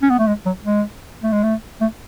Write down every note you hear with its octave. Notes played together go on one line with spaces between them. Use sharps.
C#4
B3
A3
G#3
F#3
G#3
A3
G#3
A3
A3